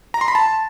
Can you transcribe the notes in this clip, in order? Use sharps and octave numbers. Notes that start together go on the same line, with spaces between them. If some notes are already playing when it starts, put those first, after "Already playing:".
A#5
C6
B5
A5